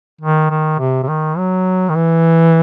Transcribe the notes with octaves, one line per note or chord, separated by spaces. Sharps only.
D#3
D#3
C3
C3
D#3
F#3
D#3
E3